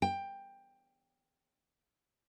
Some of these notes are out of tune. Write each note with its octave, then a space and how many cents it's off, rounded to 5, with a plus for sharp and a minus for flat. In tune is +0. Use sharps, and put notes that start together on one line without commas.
G5 +15